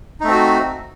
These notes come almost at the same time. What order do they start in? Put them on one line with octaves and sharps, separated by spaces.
D#4 A3 C4 F#4